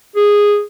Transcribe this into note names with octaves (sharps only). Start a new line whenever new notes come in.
G#4